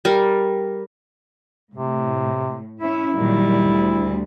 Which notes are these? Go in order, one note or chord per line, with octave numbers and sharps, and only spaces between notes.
G3 A#4
A2 C3
C#4 E4 E5
A#2 D#3 F#3 G3
D2